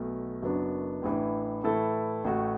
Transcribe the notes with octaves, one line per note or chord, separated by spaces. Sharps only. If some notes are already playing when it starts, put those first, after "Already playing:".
Already playing: B1 B2 F#3 A3
F#1 F#2 F#3 B3 D4
A1 A2 E3 D4
A2 E3 A3 E4 A4
A1 A2 A3 F#4